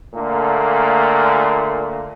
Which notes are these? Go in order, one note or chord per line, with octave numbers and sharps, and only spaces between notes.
A#2 D3 A3 A#3